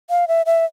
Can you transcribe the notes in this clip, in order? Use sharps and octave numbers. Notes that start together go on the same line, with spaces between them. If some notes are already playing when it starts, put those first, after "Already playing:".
F5
E5
E5